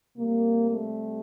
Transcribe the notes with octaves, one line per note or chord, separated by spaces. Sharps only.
C3 G3 A#3
A3